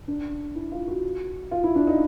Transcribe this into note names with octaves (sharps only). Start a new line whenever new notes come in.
D4
E4
F4
F#4
F4
E4
D4
D#4